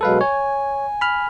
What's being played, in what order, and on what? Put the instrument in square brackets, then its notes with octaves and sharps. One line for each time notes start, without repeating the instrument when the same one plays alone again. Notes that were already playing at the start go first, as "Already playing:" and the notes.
[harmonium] B2 F#3 G#3 [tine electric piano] A4 B4 F5
[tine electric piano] C#5 [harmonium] G#5
[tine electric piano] B5 F6